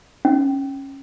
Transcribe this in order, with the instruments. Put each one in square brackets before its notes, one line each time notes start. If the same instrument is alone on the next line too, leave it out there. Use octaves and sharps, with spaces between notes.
[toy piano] C#4